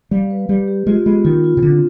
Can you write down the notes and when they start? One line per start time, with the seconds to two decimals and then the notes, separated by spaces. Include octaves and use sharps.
0.11 G3 F5
0.31 B4
0.49 G3 G4
0.68 G4
0.87 G#3 F4
1.06 G#3 B3
1.25 D#3 F4
1.44 F4
1.57 C3
1.62 D3 C4